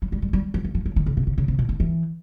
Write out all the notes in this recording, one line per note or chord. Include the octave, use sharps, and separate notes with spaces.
F#3
G3
G3
G3
F3
E3
F3
F#3
D#3
C#3
C3
C#3
C#3
C3
A#2
D#3
E3